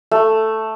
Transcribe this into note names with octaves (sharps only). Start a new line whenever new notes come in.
A3